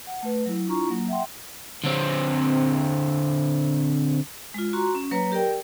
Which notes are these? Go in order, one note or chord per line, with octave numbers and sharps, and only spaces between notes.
F#5
A3 B4
F#3 E4
D4 E4 F4 A#5 C#6
F#3 A#3
E5 F#5 G5 C6
D3 C4
G#3 F4
F#4 A#5 C6 C#6
C#4
F#3 A#3 B4 C#5 A#5
G4 A#4 D5 G5